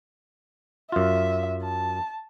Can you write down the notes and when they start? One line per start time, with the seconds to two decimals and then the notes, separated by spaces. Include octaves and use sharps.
0.92 F#2 F4 E5
1.63 A5